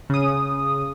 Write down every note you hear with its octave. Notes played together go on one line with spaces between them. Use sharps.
C#3 D#6